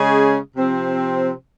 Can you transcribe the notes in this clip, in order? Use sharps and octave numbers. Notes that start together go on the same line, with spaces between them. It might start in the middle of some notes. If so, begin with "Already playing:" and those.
Already playing: C#3 G#3 C#4 G#4
C3 F3 C4